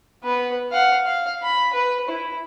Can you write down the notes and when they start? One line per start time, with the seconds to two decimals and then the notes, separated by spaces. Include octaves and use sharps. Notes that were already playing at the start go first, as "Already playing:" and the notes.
0.24 B3 B4
0.71 F5 F#5
1.05 F5
1.43 B5
1.73 B4
2.08 E4